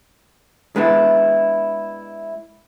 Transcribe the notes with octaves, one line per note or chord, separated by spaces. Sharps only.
G#3 B3 D4 E4